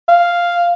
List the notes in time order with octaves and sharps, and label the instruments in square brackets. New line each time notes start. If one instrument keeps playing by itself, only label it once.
[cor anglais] F5